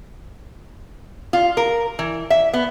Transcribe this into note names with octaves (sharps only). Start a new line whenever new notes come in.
F4
A#4
E3
E5
B3